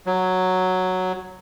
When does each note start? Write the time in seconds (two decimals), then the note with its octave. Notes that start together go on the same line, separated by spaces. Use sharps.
0.06 F#3